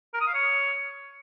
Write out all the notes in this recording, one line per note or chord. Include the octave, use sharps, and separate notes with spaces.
A#4
D#6
F5
C#5